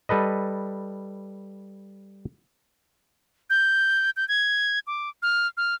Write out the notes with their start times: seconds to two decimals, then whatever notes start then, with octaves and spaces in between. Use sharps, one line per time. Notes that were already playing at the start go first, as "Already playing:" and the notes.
0.09 G3 A4 B4 D#5
3.50 G6
4.17 G6
4.29 G#6
4.87 D6
5.22 F6
5.57 F6